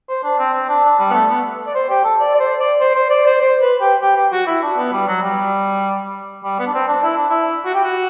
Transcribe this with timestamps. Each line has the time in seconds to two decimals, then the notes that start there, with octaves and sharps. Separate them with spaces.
0.09 C5
0.23 D4
0.38 C4
0.53 C4
0.68 D4
0.84 D4
0.99 G3
1.10 B3
1.14 A3
1.29 B3
1.67 D5
1.75 C5
1.89 G4
2.04 A4
2.20 D5
2.34 D5
2.40 C5
2.60 D5
2.81 C5
2.95 C5
3.10 D5
3.26 C5
3.41 C5
3.61 B4
3.81 G4
4.02 G4
4.16 G4
4.32 F#4
4.47 E4
4.62 D4
4.77 B3
4.92 G3
5.08 F#3
5.22 G3
6.44 G3
6.59 B3
6.67 D4
6.74 C4
6.88 D4
7.03 E4
7.17 D4
7.30 E4
7.65 F#4
7.74 G4
7.84 F#4